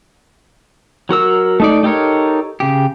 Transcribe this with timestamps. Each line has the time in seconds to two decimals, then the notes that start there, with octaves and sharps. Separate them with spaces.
1.09 F#3 F#4 A#4 E6
1.60 A3 D#4 D5
1.83 D#4 G4 A4 A#4 C#5
2.60 C#3 G4